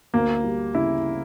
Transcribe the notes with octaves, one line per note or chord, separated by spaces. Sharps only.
D2 A#3
G3
C#3 E4